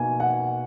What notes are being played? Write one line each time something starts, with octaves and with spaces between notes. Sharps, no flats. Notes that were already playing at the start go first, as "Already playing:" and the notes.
Already playing: B2 A#3 D#4 G#5
F#5